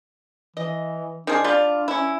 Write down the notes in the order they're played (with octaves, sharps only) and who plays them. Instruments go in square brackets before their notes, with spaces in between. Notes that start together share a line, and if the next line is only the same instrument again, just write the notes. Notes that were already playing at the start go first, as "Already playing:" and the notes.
[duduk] E3 [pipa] D#5
[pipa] D#3 C4 G#4 [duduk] D4
[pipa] G3 F4
C#4 E4